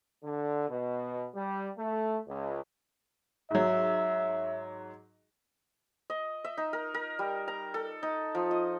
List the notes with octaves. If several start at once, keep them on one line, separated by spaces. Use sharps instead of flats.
D3
B2
G3
A3
C#2
G#2 F#3 E5
D#5
E5
D#4
A#4
A#4
G3
A#5
A4
D#4
F3
D#5